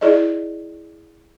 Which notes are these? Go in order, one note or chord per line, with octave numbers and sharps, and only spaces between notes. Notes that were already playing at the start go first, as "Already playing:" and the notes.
E4 G#4 D5 D#5